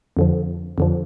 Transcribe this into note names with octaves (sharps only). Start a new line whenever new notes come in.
F2 D3 F3
F2 D3 F3